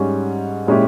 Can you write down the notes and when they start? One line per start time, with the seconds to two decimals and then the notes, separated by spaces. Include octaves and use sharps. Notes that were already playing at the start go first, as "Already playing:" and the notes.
Already playing: G#2 G3 C#4
0.67 A#2 G#3 C#4 E4 G4